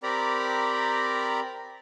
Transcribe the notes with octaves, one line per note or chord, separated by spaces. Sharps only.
C4 G4 A#4 D5 A#5 B5